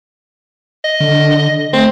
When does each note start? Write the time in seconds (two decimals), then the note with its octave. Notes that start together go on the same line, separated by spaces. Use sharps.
0.84 D#5
1.00 D3
1.73 A3 C4